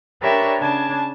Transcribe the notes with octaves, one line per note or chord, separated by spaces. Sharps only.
D4 G4 A#4 B4 C#5 E5
C#3 D4 A5 G#6